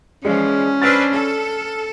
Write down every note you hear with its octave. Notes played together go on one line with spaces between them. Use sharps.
E3 F3 G#3 C#4 D5
D4 B4 C5 E6 F6 A6
A4